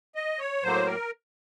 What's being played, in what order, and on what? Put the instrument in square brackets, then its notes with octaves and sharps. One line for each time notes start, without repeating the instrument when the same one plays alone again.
[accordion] D#5
C#5
A2 F#3 A#3 C5
A#4